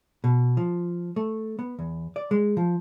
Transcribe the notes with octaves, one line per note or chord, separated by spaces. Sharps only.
B2
F3
A3
B3
E2
D5
G#3
F3